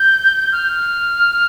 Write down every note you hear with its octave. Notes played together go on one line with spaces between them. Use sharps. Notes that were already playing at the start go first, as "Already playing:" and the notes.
Already playing: G6
F6